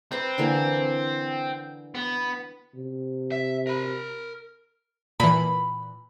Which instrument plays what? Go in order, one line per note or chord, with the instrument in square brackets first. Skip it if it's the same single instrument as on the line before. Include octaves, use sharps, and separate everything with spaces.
[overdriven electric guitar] C4 [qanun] B4 A#5
[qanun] D3 E3 A#3
[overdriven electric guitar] B3
[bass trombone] C3
[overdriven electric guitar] E5
A#4 B5
[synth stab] A#2 E3 [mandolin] B5